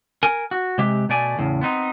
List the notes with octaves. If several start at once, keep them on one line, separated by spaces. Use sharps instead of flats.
A#4 G#5
F#4
C3 G#3 G4 E5
B2 A3 D5 G#5
E2 A2 C#3
B3 C4 D#4